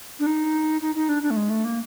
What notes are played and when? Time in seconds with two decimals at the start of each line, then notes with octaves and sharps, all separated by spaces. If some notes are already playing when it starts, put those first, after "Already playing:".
0.20 D4
0.26 D#4
0.81 D#4
0.95 D#4
1.09 D4
1.23 D4
1.31 A3
1.37 G#3
1.50 A3
1.65 A#3